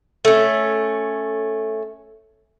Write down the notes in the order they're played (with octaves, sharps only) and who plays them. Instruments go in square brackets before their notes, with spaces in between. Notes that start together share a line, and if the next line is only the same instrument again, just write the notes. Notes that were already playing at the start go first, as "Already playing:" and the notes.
[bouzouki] A3 C#4